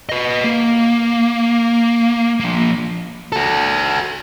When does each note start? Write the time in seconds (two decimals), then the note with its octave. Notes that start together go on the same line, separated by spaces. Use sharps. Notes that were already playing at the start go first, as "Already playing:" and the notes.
0.09 B4 D#5
0.44 A#3
2.40 F3 A#3
3.32 F#4 A4